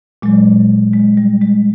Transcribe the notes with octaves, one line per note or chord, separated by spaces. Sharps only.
A#2 F#3 G#3
G#3
G3
G#3